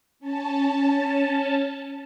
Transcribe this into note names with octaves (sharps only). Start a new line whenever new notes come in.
C#4 A5